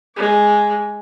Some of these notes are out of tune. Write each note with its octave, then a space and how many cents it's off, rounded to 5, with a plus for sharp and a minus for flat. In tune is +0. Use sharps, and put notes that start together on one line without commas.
G#3 +0 D6 -35